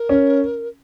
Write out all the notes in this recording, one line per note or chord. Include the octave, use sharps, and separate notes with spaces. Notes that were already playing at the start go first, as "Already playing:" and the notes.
Already playing: A#4
C#4